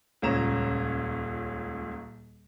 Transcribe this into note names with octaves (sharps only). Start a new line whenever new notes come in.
D#1 C#2 C#4 A#5 E7